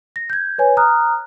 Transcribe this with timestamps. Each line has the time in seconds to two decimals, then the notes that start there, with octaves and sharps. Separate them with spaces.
0.16 A#6
0.30 G6 G#6
0.58 B4 C#5 G#5
0.77 A#5 D#6 F6 F#6